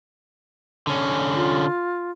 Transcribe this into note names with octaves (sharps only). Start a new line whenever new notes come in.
D3 C#4
F4